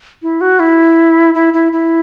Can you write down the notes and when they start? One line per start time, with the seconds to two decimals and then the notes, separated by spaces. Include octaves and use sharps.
0.22 E4
0.41 F#4
0.60 E4
1.35 E4
1.54 E4
1.73 E4